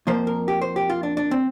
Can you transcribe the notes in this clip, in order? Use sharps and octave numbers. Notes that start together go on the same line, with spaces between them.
F2 F3 A#3 C5
A#4
G4
C5
G4
F4
D4
D4
C4